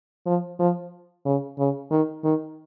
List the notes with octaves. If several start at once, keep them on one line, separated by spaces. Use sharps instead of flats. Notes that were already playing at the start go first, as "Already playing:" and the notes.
F3
F3
C#3
C#3
D#3
D#3